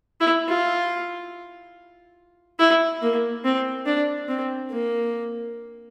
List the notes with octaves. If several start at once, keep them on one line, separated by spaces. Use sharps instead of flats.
E4
F4
E4
A#3
C4
D4
C4
A#3